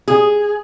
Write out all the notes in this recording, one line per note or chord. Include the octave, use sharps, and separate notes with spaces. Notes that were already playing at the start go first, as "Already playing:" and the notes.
G#4